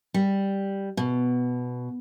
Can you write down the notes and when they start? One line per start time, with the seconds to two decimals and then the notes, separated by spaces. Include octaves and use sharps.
0.14 G3
0.97 B2